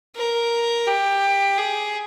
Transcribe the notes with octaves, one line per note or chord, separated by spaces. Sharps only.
A#4
G4
G#4